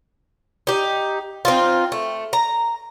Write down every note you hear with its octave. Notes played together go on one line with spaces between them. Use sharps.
D#4 G4
C4 D#4 F4
A3
A#5